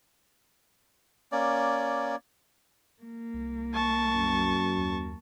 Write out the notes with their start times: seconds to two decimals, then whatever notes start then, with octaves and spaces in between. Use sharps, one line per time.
1.32 A#3 C#4 D5
3.04 A#3
3.34 C2
3.74 A5 C#6
4.16 F#2
4.77 D#2